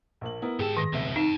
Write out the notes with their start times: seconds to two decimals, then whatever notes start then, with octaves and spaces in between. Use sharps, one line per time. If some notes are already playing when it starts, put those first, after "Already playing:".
0.21 A#1 A#3 F#7
0.42 B3 E4 A#4
0.60 G#2 G4 G#4 A5
0.77 D#3 D#6 A#6
0.93 F1 C#2 B2 E5 G7
1.16 D#4 G5 A5